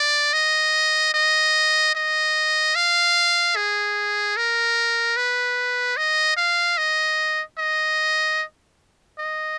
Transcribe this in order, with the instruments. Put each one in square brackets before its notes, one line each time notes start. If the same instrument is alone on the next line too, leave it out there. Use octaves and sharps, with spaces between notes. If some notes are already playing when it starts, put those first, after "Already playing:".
Already playing: [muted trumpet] D5
D#5
D#5
D#5
F5
G#4
A#4
B4
D#5
F5
D#5
D#5
D#5